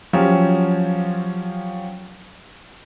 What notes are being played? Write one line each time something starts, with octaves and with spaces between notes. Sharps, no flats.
F3 F#3 C#4 G4